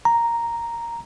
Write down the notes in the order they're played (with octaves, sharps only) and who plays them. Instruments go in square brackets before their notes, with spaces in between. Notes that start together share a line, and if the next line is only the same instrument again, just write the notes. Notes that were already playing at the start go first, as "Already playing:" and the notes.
[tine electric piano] A#5